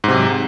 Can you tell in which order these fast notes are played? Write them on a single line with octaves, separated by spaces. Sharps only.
G#2 C3 F#3